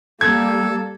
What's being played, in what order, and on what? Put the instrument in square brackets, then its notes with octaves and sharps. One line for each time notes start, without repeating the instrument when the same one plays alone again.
[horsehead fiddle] G3 A#3 [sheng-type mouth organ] A4 [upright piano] G#6